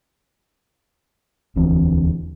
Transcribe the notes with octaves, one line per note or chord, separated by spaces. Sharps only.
E1 D2 E3 C4